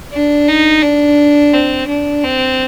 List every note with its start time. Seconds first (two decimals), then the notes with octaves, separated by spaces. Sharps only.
0.13 D4
0.48 D#4
0.82 D4
1.53 C4
1.88 D4
2.23 C4